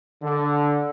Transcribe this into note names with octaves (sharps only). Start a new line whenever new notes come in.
D3